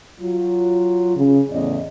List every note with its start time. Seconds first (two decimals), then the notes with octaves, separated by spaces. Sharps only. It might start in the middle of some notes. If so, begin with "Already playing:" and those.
0.21 F#3 F4
1.17 C#3
1.51 E2 A2 C#3 D5 D#5